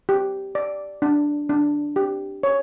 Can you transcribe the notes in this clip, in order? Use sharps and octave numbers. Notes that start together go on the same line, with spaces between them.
G4
D5
D4
D4
G4
C#5